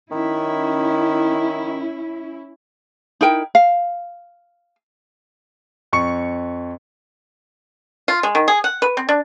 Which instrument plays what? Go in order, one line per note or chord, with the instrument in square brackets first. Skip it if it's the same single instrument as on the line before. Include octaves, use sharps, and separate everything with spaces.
[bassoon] D#3 [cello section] C#4 E4
[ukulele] D#4 E4 A#4 G5
F5
[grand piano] F2 C#6 C#7
[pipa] F4
G#3
D#3
G#4
F#5
B4
C4
D4